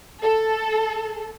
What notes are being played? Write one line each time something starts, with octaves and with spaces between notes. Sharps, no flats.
A4